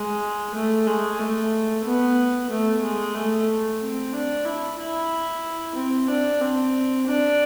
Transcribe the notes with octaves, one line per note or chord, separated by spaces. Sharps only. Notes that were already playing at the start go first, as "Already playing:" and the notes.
Already playing: G#3
A3
G#3
A3
B3
A3
G#3
A3
C4
D4
E4
E4
C4
D4
C4
D4